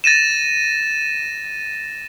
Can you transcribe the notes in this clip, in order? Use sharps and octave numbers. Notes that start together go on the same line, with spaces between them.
A6 A#6 D#7 E7